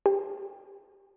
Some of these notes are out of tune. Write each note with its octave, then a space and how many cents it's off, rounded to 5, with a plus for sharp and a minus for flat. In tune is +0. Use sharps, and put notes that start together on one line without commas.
G4 +20